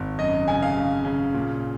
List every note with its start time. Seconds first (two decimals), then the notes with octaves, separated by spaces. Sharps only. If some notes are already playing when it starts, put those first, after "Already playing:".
Already playing: G#1
0.19 F#2 D#5
0.48 C#3 G#5
0.62 F5
0.77 C#3
1.05 C#3
1.34 A#2